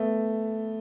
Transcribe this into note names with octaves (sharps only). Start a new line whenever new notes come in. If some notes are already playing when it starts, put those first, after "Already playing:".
Already playing: A3 B3